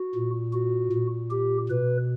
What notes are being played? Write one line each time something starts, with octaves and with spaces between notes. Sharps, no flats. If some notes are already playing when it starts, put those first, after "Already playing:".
Already playing: F#4
A#2
F#4
A#2
G4
B2 B4